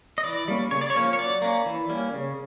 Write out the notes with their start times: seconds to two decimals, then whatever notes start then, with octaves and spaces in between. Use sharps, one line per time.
0.18 D#5
0.24 E3 D5
0.48 G3 A#3 C#4
0.71 C#3 C#5
0.81 D5
0.90 C#5
0.96 F3 A#3 C#4
1.13 C#5
1.18 F#3 D5
1.42 A#3 C#4
1.66 E3
1.89 G3 A#3 C#4
2.13 C#3